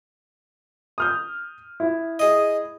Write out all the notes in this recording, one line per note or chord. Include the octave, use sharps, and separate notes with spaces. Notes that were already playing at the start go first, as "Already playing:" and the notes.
D#6 F6 G6
E4
G#4 D#5